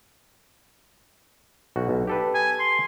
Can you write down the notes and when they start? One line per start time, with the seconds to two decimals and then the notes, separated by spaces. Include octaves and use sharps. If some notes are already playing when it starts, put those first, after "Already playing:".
1.76 B1 F#4
1.89 B1
2.07 G4 A4 B4
2.34 G#5
2.60 C6